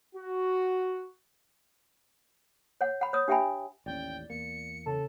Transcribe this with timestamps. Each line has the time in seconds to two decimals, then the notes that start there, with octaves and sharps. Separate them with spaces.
0.16 F#4
2.81 C#5 F#5
3.01 F#5 B5
3.13 C#5 D#6
3.28 D4 G4 E5 G5 G#5 B5
3.86 A1 D#2 C#4 D5 G5
4.30 E2 A#3 C#7
4.86 C#3 A4